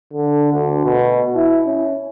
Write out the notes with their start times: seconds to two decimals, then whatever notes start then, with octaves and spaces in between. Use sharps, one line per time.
0.13 D3
0.53 D2
0.85 B2
1.36 E4
1.66 C#4